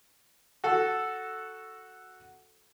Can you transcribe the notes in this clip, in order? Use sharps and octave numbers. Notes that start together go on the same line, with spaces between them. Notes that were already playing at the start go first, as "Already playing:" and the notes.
F#4 A4